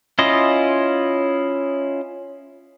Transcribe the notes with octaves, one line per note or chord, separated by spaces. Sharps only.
C#4 E4 F4 D#5